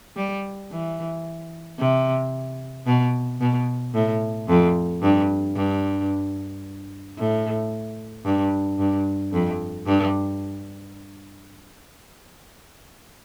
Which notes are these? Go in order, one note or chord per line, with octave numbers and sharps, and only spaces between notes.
G3
E3
C3
B2
B2
A2
F2
G2
G2
A2
G2
G2
F2
G2